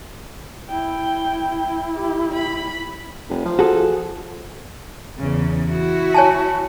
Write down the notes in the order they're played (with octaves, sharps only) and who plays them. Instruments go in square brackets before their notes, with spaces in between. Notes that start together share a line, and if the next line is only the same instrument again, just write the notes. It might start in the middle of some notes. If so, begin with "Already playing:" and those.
[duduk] E4 [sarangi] G5
[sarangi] G4
B5
[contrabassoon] F1
F3
[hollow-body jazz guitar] F#4 G#4 A4
[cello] E2 C#3
E4 F#4
[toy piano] C#5 G#5 A5